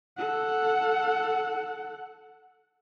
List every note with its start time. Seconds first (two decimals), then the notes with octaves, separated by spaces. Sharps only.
0.17 A4 F#5